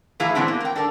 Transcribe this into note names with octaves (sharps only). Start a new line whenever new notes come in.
A2 E3 E4 G#4 F5 A#5
A#2 C#3 G#3 B3 C4 D4
A#3
A#4 G5
D4 A4 A#4